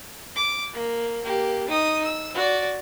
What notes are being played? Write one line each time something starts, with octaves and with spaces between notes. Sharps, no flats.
D6
A#3
A#3 G4
D#4 D#6
E6
F#4 D5